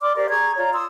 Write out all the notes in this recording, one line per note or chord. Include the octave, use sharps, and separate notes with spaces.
D5 C6 D6 F6
G4 A#4 C5 D5
G#4 A#5 C#6 G#6
F4 C#5 D5 A#5
C6 D#6 E6